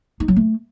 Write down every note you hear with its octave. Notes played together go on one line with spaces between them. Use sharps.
D#4
F#3
A3